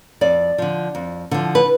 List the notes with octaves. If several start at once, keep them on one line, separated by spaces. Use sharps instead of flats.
F2 D5
D3 F3
F2
D3 F3
B4